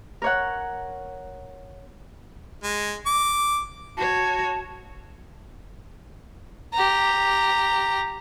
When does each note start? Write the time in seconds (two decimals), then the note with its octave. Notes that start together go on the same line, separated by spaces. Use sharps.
0.22 A#4 C#5 F#5
2.63 G#3
3.06 D6
3.97 F#4 C#5 A5
6.73 G4 A#5